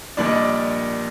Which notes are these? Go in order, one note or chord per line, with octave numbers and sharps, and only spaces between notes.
A#1 A#2 G3 D4 D5
D#5
D5